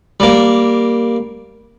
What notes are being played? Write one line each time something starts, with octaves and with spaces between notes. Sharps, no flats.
G3 A#3